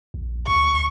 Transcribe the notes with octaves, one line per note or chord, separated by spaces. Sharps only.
A#1
D2 C#6